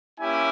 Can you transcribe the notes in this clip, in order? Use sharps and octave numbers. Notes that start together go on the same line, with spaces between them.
A#3 C#4 E4 G4 G#5